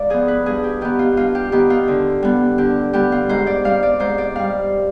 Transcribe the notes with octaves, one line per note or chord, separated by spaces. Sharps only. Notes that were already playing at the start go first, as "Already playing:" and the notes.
Already playing: G#2 D5 F5
F3 B3 G#4
B4
G2 G#4
G4
D#3 B3 G4
F4
G2 F4
G4
D#3 B3 G4
F4
D3
G3 B3
D3 G4
G3 B3 G4
F4
G#2 C5
D5
G3 C4 F5
D5
G#2 C5
D5
G3 C4 F5